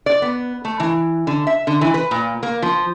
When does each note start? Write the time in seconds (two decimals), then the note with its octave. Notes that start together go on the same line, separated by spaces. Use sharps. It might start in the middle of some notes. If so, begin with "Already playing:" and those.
0.06 D5
0.22 B3
0.65 A3
0.80 E3
1.27 D3
1.47 E5
1.67 D3
1.81 E3
1.94 B4
2.11 A#2
2.43 A#3
2.62 F3